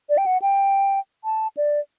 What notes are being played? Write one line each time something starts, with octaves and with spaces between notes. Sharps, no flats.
D5
G5
F#5
G5
A5
D5